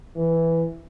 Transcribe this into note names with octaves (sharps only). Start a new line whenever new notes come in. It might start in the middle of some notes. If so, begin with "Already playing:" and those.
E3